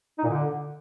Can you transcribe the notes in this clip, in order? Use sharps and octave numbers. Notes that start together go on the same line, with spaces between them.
D#4
A#2
D3